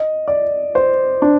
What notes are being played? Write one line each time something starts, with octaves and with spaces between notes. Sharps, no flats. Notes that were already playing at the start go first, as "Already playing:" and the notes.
Already playing: D#5
D5
C5
D4